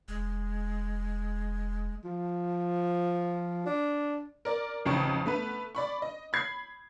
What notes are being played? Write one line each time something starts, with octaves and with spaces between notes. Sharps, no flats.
E1 G#3
F3
D4
A#4 D5
A1 F2 C#3 D#4 C#6 D7
A3 B3 B4
D5 B5 C#6
D#5
B5 G#6 C7